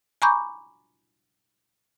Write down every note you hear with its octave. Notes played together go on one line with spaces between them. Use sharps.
G#5 A#5 B5 C#6 D6 G6